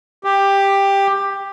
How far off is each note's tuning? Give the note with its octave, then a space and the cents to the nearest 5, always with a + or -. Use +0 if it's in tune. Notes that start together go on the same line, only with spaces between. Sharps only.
G4 +10